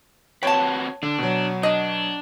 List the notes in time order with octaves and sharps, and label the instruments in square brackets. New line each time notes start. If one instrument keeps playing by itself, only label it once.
[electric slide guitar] C4 F#4 B4 [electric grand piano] C#5 [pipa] G5 A5
[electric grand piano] D3 [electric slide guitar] D4
[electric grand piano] B2 F#3
[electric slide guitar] D4 [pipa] D#5